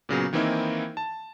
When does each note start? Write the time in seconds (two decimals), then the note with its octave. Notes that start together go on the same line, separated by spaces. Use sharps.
0.09 A#2 C#3 F#3 B3
0.33 D#3 E3 A#3 C4 D#4 E4
0.97 A5